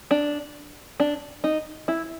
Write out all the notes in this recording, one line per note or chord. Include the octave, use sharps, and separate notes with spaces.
D4
D4
D#4
E4